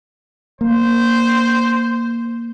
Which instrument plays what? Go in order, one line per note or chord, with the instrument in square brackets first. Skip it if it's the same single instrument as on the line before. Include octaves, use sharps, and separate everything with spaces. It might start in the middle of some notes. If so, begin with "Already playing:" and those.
[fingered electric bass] A#3 [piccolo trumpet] C5